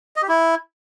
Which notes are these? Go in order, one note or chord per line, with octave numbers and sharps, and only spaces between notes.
D#5
G4
E4